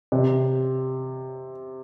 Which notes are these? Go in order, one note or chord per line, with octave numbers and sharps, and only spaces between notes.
C3